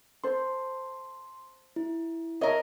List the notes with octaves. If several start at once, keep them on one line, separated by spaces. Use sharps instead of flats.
A4 C5 C6
E4
A#4 C#5 D#5 E5